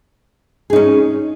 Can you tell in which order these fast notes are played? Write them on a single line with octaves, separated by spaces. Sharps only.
G#4 D#4 C#4